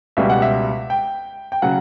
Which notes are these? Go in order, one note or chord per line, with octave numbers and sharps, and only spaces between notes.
C#2 B2 G3 E5
F#5
E5
G5
G5
C#3 F#3 F#5